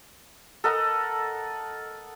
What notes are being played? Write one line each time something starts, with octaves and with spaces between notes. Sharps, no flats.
A4 A#4 D#5 F#5